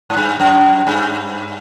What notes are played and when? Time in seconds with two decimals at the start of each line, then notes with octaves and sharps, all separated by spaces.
0.10 G#2
0.17 G2
0.40 F#2
0.87 G2